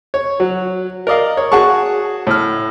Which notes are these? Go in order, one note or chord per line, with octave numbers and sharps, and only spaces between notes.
C#5
F#3
A#4 D5 D#5 F5
C#5
F#4 G#4 A5 C#6
A2 F6